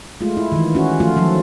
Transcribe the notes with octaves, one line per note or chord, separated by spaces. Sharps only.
G#3 A3 F4
E4
D#3 E3
C#4 F#4
F3 A3 F4
D#3 F3 F#3 A4